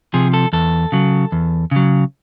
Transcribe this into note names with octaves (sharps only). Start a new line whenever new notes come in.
C3 F3 G#4
A4
E2 A4
C#3 F#3
E2
C#3 F#3